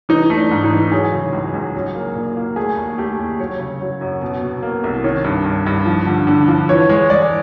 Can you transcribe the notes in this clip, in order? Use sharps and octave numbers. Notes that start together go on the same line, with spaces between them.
E3 D#4
A3
D4
G#2
D#4
E3
F#3 G#4
C#3
C#2
C#2
F#3
A#3
A#2
A#3
A3 G#4
D#2
A3 G4
D#2
F#3 C#5
C#3
F#3
F#2
B2
B2
A#3
C2
D#3 C#5
G2
G2
G2
F3
D3
D3
F3
E3 C#5
G#3 C#5
G#3 D5